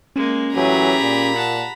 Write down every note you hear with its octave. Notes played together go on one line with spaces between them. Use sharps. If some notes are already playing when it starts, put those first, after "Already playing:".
G#3 A#3 C#4
A2 E3 F#3 G4 G#4 A#5 B5
A#2
F#5 A5